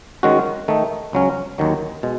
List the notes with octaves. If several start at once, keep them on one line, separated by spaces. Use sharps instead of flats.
D#3 G#3 C#4 F#4
D#3 A3 D#4
C#2 C#3 F#3 C#4
D#2 D#3 F#3
B2 G#3